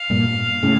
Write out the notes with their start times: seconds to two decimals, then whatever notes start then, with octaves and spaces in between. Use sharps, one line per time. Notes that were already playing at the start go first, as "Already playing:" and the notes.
Already playing: F5
0.10 G2 A#2
0.63 A2 C#3